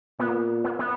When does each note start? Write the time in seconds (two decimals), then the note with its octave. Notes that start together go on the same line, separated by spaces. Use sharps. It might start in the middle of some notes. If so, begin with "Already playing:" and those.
0.19 A#2 B3
0.64 B3
0.79 B3